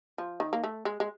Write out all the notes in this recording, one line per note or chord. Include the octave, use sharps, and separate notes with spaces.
F3
D#3
A#3
A3
G#3
G#3